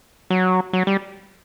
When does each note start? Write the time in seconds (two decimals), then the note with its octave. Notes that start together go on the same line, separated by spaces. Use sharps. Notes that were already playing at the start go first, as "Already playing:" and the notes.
0.30 F#3
0.73 F#3
0.87 G3